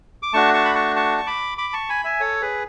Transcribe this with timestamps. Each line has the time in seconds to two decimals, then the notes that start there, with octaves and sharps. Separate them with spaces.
0.22 D6
0.33 A3 D4 F#4 A5 C#6
0.54 A5 C#6
0.65 B5
0.75 A5 C#6
0.96 A5 C#6
1.18 C#6
1.27 B5 D6
1.58 B5 D6
1.73 A5 C#6
1.89 G#5 B5
2.04 E5 G#5
2.20 A4 C#5
2.42 G#4 B4